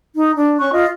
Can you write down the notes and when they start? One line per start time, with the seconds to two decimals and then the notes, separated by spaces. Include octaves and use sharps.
0.15 D#4
0.35 D4
0.59 C#4 C#6 F#6
0.72 F4 D#5